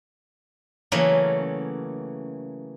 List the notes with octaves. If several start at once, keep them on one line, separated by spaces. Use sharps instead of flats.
C#3 E3 F#3 A3 A#3 C#4